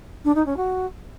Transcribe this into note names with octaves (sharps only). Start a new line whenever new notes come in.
D4
D#4
C#4
F#4